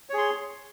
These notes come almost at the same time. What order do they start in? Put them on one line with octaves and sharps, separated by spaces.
C#5 G#4 C6